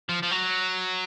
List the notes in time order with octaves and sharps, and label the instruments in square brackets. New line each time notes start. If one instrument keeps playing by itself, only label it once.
[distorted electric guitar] F3
F3
F#3